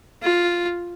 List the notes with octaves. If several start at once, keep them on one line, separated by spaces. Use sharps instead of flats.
F4